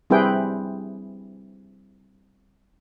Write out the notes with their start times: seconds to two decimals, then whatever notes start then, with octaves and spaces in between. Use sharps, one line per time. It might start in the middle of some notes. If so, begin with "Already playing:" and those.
0.10 G3 C4 E4 G#4 B4 G5